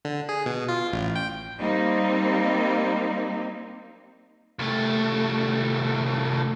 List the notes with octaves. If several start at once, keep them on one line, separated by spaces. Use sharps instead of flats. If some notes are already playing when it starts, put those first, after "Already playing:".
D3
G#4
B2
F4
A1
G5
G3 A#3 C4 D#4
C2 A3